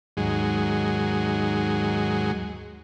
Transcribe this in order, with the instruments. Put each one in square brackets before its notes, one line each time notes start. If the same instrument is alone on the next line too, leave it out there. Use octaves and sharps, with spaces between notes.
[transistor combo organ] D#2 G#2 F#3 G#3